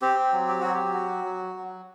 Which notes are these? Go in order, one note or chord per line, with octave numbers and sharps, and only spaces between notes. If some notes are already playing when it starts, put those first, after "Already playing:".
C4 G4
F#3
G4
F#3 F#4
G4
F#4
F#3
F#3